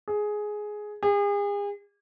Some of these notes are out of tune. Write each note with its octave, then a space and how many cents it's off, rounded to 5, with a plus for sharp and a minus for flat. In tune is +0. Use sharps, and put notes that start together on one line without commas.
G#4 +10
G#4 -40